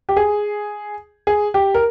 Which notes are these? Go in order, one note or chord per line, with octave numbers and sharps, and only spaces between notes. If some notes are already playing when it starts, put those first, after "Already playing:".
G4
G#4
G#4
G4
A#4